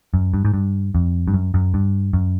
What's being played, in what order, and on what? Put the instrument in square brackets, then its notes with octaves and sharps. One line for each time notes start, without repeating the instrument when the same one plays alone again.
[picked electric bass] F#2
G2
G#2
G2
F2
G2
F#2
F#2
G2
F#2